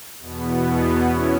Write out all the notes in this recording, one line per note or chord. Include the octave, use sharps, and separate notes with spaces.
E2 B2 B3
C#4 E4 C#5